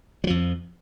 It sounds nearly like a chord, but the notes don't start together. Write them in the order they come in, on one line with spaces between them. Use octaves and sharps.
F#3 F3 F2